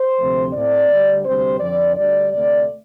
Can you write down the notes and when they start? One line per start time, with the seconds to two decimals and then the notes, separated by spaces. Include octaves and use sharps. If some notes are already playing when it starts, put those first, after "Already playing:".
Already playing: C5
0.18 D2 C3 F3 A3 C4
0.53 A2 A3 C4 D5
0.89 D2 D3 G3
1.25 D2 C3 G3 C4 C5
1.60 F2 D3 F3 C4 D5
1.96 D2 D3 G3 D5
2.32 D2 C3 A3 C4 D5